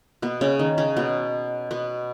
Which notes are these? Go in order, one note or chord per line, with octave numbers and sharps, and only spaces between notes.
B2 B3
C#3 C#4
D#3 D#4
C#3 C#4
B2 B3
B2 B3